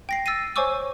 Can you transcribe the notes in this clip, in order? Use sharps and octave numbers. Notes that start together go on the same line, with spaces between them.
G5 A#6 C7
E6 A6 A#6 C7 D#7
C5 C#5 G#5 C#6 D6 E6